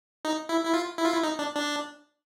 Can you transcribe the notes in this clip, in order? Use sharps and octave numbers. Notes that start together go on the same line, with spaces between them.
D#4
E4
E4
F4
E4
F4
E4
D#4
D4
D4